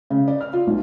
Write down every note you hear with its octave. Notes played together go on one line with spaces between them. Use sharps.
C#3
D5
F6
F4
B1